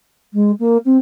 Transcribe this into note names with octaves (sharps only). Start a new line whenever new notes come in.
G#3
A#3
C4